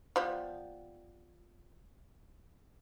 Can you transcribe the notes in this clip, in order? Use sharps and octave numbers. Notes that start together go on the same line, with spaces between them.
F3 G3 B3